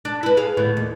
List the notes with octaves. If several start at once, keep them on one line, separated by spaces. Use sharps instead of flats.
D4
E4 B4
G#4 F5
D2 A2 B3
D#2